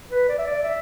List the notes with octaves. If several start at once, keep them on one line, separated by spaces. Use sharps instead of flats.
B4
D5
E5
D5
E5